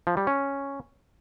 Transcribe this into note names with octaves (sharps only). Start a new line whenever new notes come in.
F3
G3
C#4